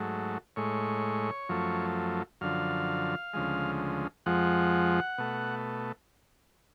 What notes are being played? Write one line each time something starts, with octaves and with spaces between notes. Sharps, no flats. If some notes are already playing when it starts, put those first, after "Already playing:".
Already playing: G#2 F#3 A3
A2 G#3 C#5
F#2 F3 A3
F#2 D3 F3 F5
D2 C#3 F3 G#3
F2 F3 G#3 F#5
B2 A3